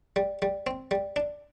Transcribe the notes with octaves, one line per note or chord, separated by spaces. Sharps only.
G3
G3
C4
G3
D4